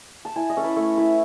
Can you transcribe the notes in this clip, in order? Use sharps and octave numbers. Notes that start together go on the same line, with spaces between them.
A5
E4 G#5
D#5
C#4 A4
B4
A3 C#5
E4 B4